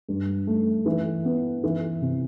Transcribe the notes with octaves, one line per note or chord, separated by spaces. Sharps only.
G2
A3
E3
B3
E3
C3